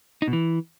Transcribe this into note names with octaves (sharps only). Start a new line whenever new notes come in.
D#4
B2
E3